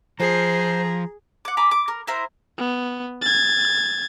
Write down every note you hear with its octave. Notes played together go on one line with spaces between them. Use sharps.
F3 G#4 C5 A#5
F#5 D6
G#5 A#5 B5 D6
D6
A#4
E4 A#4 C5
B3
G#6 A6